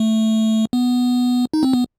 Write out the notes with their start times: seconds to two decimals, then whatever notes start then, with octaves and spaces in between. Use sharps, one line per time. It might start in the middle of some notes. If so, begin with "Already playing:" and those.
Already playing: A3
0.73 B3
1.54 D#4
1.63 C4
1.73 B3